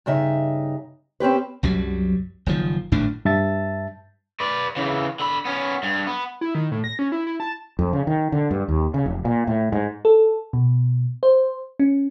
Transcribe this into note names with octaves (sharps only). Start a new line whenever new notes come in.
G2 C#3 D#4 E5
C4 C#4 G4 B4
C2 F#2 F#3 G3
F#1 D#3 F3
G#1 F#2 A2 D4
G2 E5 A5 A6
B4 D5
C#3 E3
D3 B5
B3 C#4
G2
B3
E4
D#3
A2
A#6
C#4
E4
E4
A5
F2
C#3
D#3
D3
G2
D#2
C#3
F1
A#2
A2
G#2
A4
B2
C5
C#4